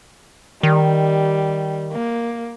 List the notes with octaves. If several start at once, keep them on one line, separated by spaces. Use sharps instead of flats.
D#3 G3
A#3